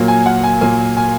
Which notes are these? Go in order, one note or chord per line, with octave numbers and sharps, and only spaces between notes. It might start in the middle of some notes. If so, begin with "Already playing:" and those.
Already playing: A#2 F#3 A#3
G#5
F#5
G#5
A#2 F#3 A#3 G#5
G#5